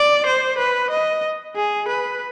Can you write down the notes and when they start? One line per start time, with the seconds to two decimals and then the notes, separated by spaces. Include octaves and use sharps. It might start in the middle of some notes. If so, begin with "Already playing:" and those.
Already playing: D5
0.26 C5
0.58 B4
0.90 D#5
1.56 G#4
1.88 B4